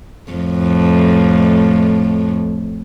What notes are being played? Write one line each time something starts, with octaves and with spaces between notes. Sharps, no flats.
F2 A2